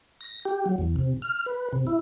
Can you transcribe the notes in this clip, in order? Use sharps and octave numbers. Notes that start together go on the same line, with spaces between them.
A#6
G4
F#3
E2
C3
F6
B4
C3
E4